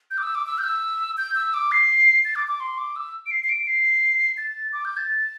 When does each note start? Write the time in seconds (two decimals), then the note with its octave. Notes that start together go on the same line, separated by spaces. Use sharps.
0.11 G6
0.18 D6
0.23 E6
0.35 D6
0.46 E6
0.58 G6
0.64 E6
1.18 G6
1.35 E6
1.54 D6
1.72 C7
2.25 A6
2.36 D6
2.47 D6
2.60 C6
2.78 D6
2.96 E6
3.26 D7
3.31 C7
3.44 C7
3.49 D7
3.67 C7
4.37 A6
4.73 D6
4.85 G6
4.97 A6